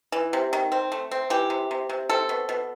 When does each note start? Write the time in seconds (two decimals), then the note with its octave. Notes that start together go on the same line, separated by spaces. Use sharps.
0.12 E3
0.33 C3
0.53 D#3
0.72 C4
0.92 A3
1.11 C4
1.30 E3 G4
1.50 C3
1.71 C3
1.89 C3
2.09 C4 A4
2.29 B2
2.49 B2